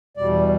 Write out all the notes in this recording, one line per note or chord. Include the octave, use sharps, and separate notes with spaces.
E2 B2 G3 D5